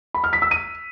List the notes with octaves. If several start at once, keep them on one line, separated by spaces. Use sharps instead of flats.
B5
F6
B6
E6
D#7